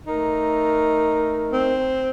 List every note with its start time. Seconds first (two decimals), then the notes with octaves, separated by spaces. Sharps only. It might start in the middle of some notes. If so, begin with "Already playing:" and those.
0.07 A3 D#4 A#4
1.53 C4